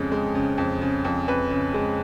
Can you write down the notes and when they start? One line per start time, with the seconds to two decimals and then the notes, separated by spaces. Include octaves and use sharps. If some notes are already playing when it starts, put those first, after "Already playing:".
Already playing: F2 C#3 G#3
0.12 G#3
0.35 C#3
0.58 F2
0.82 C#3
1.05 F2
1.28 F2 B4
1.51 C#3
1.74 G#3